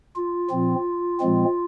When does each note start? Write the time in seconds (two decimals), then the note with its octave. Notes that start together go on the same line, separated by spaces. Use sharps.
0.16 F4
0.50 A#2 F3 C4
1.20 A#2 F3 G#3 C4